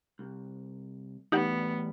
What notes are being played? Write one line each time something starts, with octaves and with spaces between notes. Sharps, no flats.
C2
E2 A2 G3 B3 D#4 G4 F#5